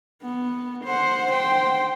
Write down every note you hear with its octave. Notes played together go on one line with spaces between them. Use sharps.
B3
C5 F#5
C5 G5